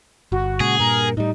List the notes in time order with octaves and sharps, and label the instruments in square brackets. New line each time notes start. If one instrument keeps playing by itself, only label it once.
[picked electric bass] G1 [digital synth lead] F#4
[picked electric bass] A#2 C#3 G#3 [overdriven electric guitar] G#4
[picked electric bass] G2 A#2 [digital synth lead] A#4
[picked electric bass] A2 G3 [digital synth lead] D#4